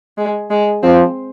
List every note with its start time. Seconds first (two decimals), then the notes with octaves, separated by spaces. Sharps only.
0.18 G#3
0.50 G#3
0.83 F3 C4